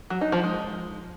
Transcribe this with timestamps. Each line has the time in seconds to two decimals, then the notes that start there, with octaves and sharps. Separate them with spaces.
0.10 F#3
0.21 D#4
0.32 F3
0.43 G#3